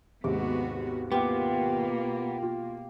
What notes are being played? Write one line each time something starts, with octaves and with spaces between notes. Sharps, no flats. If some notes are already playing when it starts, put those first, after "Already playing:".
D#2 G#2 C3 B3 F#4 D6
B2 A#3 B3 F4 G4
F4